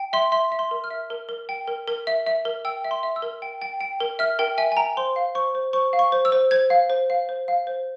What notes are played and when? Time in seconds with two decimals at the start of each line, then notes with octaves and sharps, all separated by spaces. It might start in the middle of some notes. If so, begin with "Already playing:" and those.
Already playing: G5
0.13 E5 C6
0.32 E5 C6
0.52 E5
0.59 C6
0.71 A#4
0.84 F6
0.91 E5
1.10 A#4
1.29 A#4
1.49 G5
1.68 A#4
1.88 A#4
2.07 E5
2.26 E5
2.45 A#4
2.65 G5 E6
2.84 E5
2.91 C6
3.03 E5
3.16 E6
3.22 A#4
3.42 G5
3.62 G5
3.81 G5
4.00 A#4
4.19 E5 F6
4.39 A#4 G5
4.58 E5 G#5
4.72 G#5
4.77 G5 A#5
4.97 C5 C6
5.16 F5
5.35 C5 C#6
5.55 C5
5.73 C5 C#6
5.93 F5
5.99 C#6
6.12 C5
6.25 E6
6.32 C5
6.51 C5 G#6
6.70 F5
6.90 C5
7.10 F5
7.29 C5
7.48 F5
7.67 C5